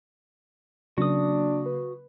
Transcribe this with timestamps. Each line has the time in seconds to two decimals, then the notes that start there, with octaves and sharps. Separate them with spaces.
0.98 C#3 F#3 A#3 D4 F#4 D#6
1.66 B4